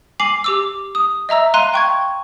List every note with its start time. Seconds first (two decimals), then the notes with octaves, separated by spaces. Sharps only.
0.20 G#5 D6 C7 F#7
0.44 G4 D6 E6
0.95 D#6
1.29 D#5 E5 A#5 E6
1.54 F5 A#5 C6 F#6 D#7
1.74 G5 C#6 G#6